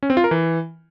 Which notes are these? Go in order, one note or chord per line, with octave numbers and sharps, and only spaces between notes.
C#4
C4
F4
A#4
E3